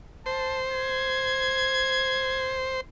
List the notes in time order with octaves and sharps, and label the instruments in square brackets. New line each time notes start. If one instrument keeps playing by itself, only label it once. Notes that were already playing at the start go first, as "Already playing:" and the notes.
[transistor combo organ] C5 [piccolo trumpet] A5
[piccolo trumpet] G#6